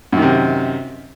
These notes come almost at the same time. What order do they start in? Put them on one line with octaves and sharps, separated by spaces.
F#2 D#3 C3